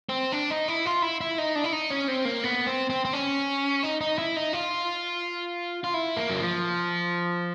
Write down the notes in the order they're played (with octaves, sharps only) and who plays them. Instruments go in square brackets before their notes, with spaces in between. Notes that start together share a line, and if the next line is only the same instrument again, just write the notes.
[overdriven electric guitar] C4
D4
D#4
E4
F4
E4
E4
D#4
D4
E4
D#4
C#4
C4
A#3
B3
C4
C4
C4
C#4
D#4
D#4
E4
D#4
F4
F4
E4
A#3
F#3
F3